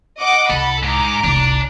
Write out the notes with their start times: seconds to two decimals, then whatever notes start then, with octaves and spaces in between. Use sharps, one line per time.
0.19 D#5 F#5 D6
0.50 C2 A4 B5
0.83 G#2 A#5 D6
1.24 F1 C2 D4